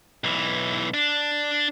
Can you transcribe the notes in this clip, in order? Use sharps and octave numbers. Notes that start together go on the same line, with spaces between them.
B1 E3
D4